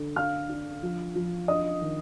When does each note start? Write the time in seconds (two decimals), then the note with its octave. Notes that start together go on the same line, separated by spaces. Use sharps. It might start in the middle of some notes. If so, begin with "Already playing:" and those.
Already playing: D3
0.16 D4 F5 F6
0.49 D4
0.83 F3
1.15 F3
1.48 D4 D#5 D#6
1.81 D#3